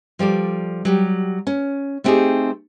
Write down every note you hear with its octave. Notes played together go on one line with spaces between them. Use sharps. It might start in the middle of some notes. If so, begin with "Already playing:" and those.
F3 G3 A4 D5
F#3 G3 G4
C#4
A3 B3 C4 D#4 G4 G#4